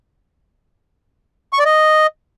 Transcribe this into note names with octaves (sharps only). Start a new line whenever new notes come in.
C#6
D5
D#5